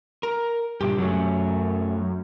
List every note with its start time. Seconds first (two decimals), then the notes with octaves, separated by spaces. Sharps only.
0.23 A#4
0.81 G2 A#2 C#3 G4
0.98 F#2 F#3 A3 C#4